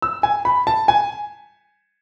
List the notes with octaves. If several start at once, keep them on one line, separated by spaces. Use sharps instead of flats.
E6
G#5
B5
A5
G#5